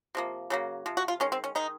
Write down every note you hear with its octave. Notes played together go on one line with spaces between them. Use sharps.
C3 F3 A#3
C#3 F#3 A#3
C3 F3
F#4
F4
D#3 G#3 C#4
C4
C#4
D#3 G#3 D#4